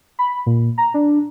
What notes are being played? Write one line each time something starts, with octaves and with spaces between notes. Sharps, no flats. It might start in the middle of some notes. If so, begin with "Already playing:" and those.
B5
A#2
A#5
D4